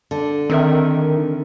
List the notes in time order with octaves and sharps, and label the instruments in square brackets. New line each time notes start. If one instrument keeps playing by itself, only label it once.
[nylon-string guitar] D3
[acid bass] D#3 [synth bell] C4 A#4 E5